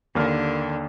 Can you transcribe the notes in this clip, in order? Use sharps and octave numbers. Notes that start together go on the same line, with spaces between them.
D#2 D3 A#3 F6